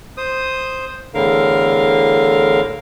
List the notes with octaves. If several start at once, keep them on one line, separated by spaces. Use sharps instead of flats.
C5 D#6
E2 A2 D3 A#4 F5